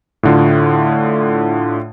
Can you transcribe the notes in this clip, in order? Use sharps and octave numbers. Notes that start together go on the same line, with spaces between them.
A2 D3 F4